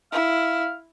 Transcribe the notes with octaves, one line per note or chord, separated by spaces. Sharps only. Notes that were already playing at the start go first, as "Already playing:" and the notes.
E4 F5